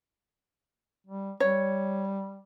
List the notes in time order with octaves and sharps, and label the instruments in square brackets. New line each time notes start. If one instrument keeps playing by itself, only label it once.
[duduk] G3
[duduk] G3 [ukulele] C#5